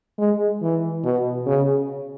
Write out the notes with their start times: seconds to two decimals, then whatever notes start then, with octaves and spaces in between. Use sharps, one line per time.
0.18 G#3
0.62 E3
1.05 B2
1.47 C#3